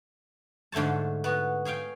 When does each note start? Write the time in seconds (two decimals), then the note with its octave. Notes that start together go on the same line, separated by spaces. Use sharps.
0.72 G#2 D3 A3 C#5 A5
1.24 B3 F#4
1.65 G#4 C#5 F5 G5